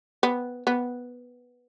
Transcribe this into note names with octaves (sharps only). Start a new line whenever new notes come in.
B3
B3